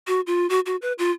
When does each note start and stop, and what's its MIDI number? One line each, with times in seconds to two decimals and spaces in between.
0.07 0.21 66
0.27 0.47 65
0.50 0.60 66
0.66 0.76 66
0.82 0.93 71
0.98 1.11 65